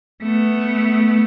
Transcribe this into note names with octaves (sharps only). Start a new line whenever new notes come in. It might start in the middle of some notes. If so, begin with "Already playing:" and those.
A3 B3